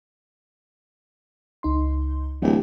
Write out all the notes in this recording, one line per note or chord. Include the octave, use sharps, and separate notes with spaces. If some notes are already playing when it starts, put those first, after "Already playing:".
C#2 D#4 C6
D1 E3 G4